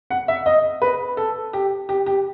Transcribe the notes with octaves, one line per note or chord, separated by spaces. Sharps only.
F#5
E5
D#5
B4
A4
G4
G4
G4